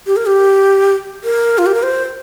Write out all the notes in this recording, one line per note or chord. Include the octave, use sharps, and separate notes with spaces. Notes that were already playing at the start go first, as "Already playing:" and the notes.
G4
A#4
G4
A#4
F4
G4
A#4
C5